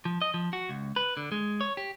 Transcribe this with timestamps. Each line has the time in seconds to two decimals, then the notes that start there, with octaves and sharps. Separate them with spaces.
0.05 F3
0.22 D#5
0.34 F3
0.53 F#4
0.69 C#2
0.96 B4
1.17 D3
1.32 G#3
1.61 C#5
1.77 G4